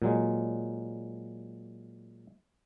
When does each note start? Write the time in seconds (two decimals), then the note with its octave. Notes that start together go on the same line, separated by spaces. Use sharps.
0.02 A#2 F#3 G#3